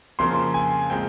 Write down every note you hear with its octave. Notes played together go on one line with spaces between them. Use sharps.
F2 C#3 F3 A#3 C6
G#5
A#2 G#3 C4 G5